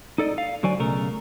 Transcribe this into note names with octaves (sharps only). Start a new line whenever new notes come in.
D#4 A4 D5 D#5
F5
D3 F#3 F#4 C5 D5 G#5
B1 C#3 A3 A#4